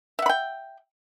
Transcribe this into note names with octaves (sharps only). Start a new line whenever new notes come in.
E5 F#5 G5 B5